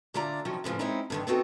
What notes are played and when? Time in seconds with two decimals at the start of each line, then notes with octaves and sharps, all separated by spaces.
0.14 D3 A3 D4 F4 D5 A#5
0.45 C3 D#3 F3 F#3 C#4
0.64 A2 C#3 E3 F3 G#3
0.79 G#3 C4 C#4 D#4 E4
1.10 G2 D3 D#3
1.27 B3 C4 D#4 F#4 G4 A4